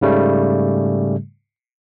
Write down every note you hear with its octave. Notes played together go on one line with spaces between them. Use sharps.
G#2 C#3 G3 A3